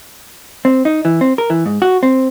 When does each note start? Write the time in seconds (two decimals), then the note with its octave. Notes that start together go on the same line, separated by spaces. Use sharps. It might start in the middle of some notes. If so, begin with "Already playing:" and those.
0.65 C4
0.85 D#4
1.05 E3
1.21 C4
1.38 A#4
1.50 E3
1.66 G#2
1.82 F#4
2.03 C4